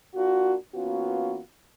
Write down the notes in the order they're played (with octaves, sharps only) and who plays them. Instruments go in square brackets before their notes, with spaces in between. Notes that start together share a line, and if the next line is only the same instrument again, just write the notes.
[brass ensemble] A#3 D4 F4 F#4
E3 A#3 B3 C#4 F4 F#4